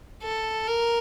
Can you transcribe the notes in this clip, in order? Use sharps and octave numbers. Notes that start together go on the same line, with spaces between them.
A4
A#4